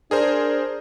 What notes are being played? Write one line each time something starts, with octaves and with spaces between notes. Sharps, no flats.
D4 G#4 A#4 C5